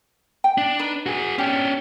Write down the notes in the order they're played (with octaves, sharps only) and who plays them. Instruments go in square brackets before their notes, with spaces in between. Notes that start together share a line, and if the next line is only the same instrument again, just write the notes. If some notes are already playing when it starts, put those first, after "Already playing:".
[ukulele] G5
[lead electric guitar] D4
[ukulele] D#4 B4
[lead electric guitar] F#4 G#4
[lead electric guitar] C#4 D4 [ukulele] G4